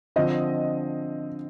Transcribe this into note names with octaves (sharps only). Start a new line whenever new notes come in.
D3 F3 C4 D#5